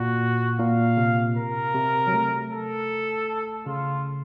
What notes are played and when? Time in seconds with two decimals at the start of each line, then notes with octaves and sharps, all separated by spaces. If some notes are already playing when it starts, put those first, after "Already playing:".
Already playing: A#2 F#4
0.59 A#2 F5
0.97 C3
1.36 A#4
1.75 C3
2.07 F#3
2.13 A3
2.51 A4
3.66 C#3 F4